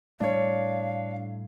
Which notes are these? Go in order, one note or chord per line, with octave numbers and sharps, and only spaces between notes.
A2 G3 A3 D4 C#5 F5